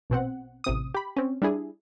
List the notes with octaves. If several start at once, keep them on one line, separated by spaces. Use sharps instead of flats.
A#1 B2 C4 F#5
A1 C3 D#6
G4 B5
C4 C#4
G3 D4 E4 G#4